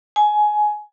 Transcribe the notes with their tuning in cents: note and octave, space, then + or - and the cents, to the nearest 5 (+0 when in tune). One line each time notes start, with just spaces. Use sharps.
G#5 +20